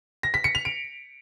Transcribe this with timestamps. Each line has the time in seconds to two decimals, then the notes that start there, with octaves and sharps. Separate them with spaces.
0.23 A#6
0.34 B6
0.44 C#7
0.55 F7
0.65 D7